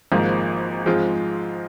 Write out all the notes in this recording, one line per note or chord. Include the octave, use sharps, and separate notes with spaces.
G#1 G#2 F3 A#3
G#2 F3 G#3 C4 F4